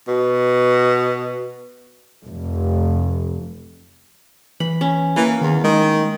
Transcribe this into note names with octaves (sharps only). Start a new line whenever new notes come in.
B2
F1
E3 B5
C#4
E3 A#3
E2 D#3
D#3 G#3